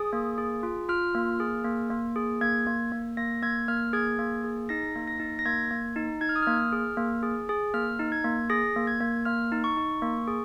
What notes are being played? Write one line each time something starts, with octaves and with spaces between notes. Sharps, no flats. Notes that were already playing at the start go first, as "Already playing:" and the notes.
Already playing: G#4 D#6
A#3
G#4
F4
F4 F6
A#3
G#4
A#3
A#3
G#4
A#3 G#6
A#3
A#3
A#3 A#6
A#3 G#6
A#3 F6
G#4 G#6
A#3
G#4
D#4 A#6
A#3
A#6
D#4
A#6
A#3 G#6
A#3
D#4
D#4 G#6
F6
D#6
A#3 F6
G#4
A#3
G#4
G#4
A#3 F6
D#4
G#6
A#3
G#4 A#6
A#3
G#6
A#3
A#3 F6
D#4
C#6
D#4
A#3
G#4